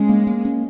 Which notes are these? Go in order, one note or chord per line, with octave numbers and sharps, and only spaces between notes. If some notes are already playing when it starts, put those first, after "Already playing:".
Already playing: G#3 C#4
A#3
A#3
C#4